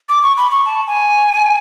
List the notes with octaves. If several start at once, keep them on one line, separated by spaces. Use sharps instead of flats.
D6
C#6
B5
C#6
A5
G#5